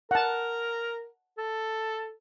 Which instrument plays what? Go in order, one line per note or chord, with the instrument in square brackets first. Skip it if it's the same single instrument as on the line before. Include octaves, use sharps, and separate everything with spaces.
[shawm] A#4 [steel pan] F#5 A5
[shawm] A4